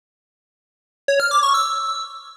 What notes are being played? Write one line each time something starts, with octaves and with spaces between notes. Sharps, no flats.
C#5
F6
D6
C#6
E6